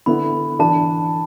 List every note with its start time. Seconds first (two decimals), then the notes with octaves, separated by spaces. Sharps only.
0.06 D3 B3 E4 B5
0.59 E3 D4 A5